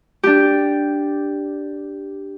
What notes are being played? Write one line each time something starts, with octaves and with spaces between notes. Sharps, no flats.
D4 G4